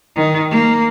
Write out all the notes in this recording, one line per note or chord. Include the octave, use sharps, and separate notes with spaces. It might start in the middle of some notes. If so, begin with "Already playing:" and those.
D#3
A#3